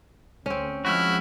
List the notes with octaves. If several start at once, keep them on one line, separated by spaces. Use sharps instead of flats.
D2 C4 C#4
F3 G#3 E4 F#4 F#5 F6